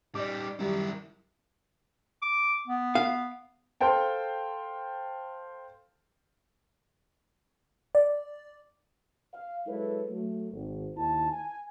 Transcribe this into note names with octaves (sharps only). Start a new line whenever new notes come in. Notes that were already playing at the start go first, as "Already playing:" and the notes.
G3 D#4 D5 D6
F#2 D#3 F#3 G3 E4 A#4
D6
B3
F5
A4 C5 F5 G5 A5
D5
F5
F#3 G#3 E4 A4 B4 C#5
F#3 A3
G#1
D#2 E4 A5
G#5